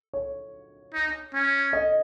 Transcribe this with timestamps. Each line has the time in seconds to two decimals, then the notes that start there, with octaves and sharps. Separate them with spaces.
0.13 C#5
0.94 D#4
1.34 C#4
1.73 D#5